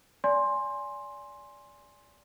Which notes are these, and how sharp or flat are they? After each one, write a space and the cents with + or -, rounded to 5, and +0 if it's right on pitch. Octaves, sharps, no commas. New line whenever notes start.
D5 -25 G#5 +0 C6 +10